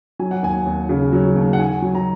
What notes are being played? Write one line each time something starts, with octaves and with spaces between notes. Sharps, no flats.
F#3 G#5
F#5
D#2 G#5
D#2
C#3
F#3
D#2
F#5
D#3 G#5
F#3
A#5